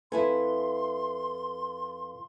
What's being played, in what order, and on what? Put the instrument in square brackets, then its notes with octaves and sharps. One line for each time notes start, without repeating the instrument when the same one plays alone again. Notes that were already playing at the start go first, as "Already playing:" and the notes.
[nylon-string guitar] F2 E4 G#5 [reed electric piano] A4 B4 [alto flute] C6